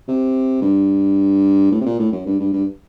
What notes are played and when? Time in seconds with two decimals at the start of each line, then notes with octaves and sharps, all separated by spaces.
0.08 C3
0.62 G2
1.72 A2
1.81 C3
1.86 A#2
1.99 A2
2.12 F#2
2.26 G2
2.40 G2
2.53 G2